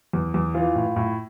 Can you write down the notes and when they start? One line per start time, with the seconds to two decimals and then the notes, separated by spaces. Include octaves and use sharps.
0.13 E2
0.34 E2
0.54 E3 F4
0.75 A2
0.96 A2